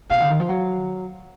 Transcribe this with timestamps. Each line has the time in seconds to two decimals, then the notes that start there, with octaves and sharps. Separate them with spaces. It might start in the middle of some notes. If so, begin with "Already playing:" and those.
0.10 B2 F5
0.20 D3
0.30 D#3
0.40 F3
0.49 F#3